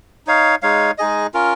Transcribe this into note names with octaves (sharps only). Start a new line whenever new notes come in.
D#4 C#5 F5
G#3 D#4 C#5 F5
G#3 D#4 G#4 D#5
C#4 F4 A#4